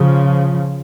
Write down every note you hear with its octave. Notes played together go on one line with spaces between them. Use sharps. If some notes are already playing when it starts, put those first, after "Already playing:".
Already playing: C#3 F3